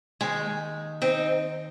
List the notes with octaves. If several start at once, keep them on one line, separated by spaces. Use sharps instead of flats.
D#2 D#3 G#3
C4 D#4